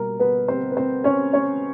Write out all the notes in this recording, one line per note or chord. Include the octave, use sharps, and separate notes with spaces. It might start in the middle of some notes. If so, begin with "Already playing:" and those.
Already playing: B2 G3 A#3 A#4
B3 B4
C4 C5
B4
C4 C5
C#4 C#5
C#4 C#5